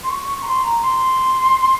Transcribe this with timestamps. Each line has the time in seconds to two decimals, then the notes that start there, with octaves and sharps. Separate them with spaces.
0.03 C6
0.09 C#6
0.28 C#6
0.42 A#5
0.46 C6
0.63 A#5
0.81 C6